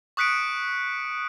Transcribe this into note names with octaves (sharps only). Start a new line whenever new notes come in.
C#6 D#6 F#6 B6 C#7 D7